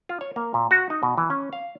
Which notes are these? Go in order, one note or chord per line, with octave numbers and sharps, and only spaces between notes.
F4
C#5
A#3
A#2
F#4
D#4
B2
E3
C#4
F5